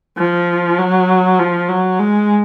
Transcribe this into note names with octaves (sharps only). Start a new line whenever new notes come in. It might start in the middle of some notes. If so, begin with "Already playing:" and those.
F3
F#3
F3
F#3
G#3